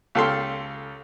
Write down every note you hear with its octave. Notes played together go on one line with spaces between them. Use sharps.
C#2 G4 A4 F5 C6